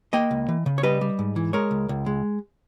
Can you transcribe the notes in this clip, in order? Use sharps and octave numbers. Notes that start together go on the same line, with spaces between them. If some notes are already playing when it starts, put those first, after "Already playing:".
A#3 D#5 G5
C#2
E3
C#3
C#5
G3 B4 D#5
G3
G#2
E3
G#3 A#4 C#5
C#2
C#2
G#3